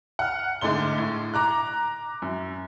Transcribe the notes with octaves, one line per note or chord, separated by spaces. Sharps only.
F#5 F6
G#2 D3 G#3 A3 C6 G7
A2
A#5 D6 F#6
F#2